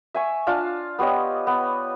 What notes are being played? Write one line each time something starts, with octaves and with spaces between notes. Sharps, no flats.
E5 G#5 C#6
D4 F4 F5 A5
B3 G4 C#5 D#5
B3